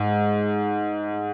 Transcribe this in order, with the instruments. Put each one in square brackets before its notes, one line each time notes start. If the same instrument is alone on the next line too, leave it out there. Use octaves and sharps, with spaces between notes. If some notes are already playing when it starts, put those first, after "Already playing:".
Already playing: [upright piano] G#2